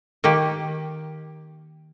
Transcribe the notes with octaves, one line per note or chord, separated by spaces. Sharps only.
D#3 A#3 G4